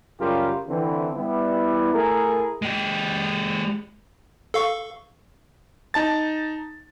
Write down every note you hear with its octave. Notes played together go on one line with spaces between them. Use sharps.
F#2 C#3 G3 F4 G4 A#4
D3 E3 C4
G3 B3 E4
A3 E4 G#4 A#4
G#3 G4
A4 F5 C#6
D#4 A5 A6